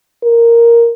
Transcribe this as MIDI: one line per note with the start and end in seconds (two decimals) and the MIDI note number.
0.23 0.92 70